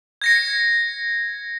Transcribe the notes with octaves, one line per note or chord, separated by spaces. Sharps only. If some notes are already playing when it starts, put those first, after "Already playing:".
G#6 A#6 C#7